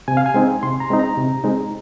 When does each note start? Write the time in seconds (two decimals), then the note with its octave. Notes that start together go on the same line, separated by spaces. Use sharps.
0.08 C3 G#5
0.17 F5
0.26 G#5
0.34 G#3 C4 D#4
0.63 C3 C6
0.80 A#5
0.90 G#3 C4 D#4
0.99 A#5
1.17 C3
1.44 G#3 C4 D#4